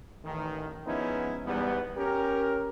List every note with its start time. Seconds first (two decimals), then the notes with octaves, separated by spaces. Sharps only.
0.24 A1 D#3
0.86 F3 G#3 B3 C#4 D#4 E4
1.45 E2 G#2 G3 B3
1.97 C#4 G4 A#4